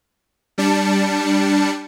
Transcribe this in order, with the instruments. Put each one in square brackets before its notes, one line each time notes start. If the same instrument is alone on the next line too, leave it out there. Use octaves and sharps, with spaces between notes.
[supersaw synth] G3 D4 A5 C#7